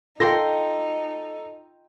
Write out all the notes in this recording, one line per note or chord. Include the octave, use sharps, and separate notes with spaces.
D#4 F4 A4 G5 C6 A#6